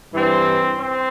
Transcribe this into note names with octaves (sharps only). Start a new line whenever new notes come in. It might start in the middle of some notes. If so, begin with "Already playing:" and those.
G2 E3 C4
C4